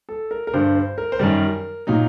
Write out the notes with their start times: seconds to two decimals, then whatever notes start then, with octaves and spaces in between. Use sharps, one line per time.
0.09 A4
0.31 A#4
0.47 A#4
0.53 G2 D3 G3 C5
0.75 C5
0.98 A#4
1.12 C5
1.19 F#2 D#3 G3 A#4
1.87 A#2 F#3 D#4